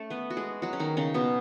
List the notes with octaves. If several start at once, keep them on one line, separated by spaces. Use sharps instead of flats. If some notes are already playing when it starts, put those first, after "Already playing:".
Already playing: A3 C#4 A4
B3 B4
F#4
G#3 G#4
F#3 F#4
C#4
D#3 D#4
C#3 C#4
B2 B3